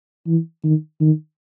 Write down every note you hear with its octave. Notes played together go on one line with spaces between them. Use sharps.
E3
D#3
D#3